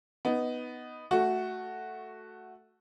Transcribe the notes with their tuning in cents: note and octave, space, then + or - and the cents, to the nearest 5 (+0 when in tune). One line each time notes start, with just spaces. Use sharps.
B3 +5 D#4 +5
A3 +0 F#4 +0